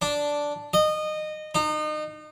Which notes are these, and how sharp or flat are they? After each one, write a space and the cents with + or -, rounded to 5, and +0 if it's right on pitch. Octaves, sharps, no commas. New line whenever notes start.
D4 -5
D#5 -20
D#4 -35